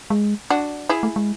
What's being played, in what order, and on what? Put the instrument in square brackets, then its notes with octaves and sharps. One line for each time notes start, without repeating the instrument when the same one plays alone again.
[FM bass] G#3
[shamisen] D4 F#4
E4 G#4
[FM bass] A3
G#3